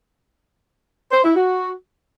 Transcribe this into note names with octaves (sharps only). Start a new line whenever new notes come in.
C5
E4
F#4